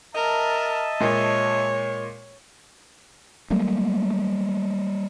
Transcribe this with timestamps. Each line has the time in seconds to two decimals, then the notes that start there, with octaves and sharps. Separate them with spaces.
0.15 A#4 D#5 E5 A5
1.01 A#2 G#3 C#5
3.50 F#3 G3 A3 A#3